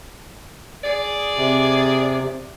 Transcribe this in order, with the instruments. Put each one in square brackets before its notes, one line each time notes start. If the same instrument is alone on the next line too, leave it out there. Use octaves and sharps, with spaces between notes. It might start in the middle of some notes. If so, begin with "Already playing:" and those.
[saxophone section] G#4 D5
[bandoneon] C3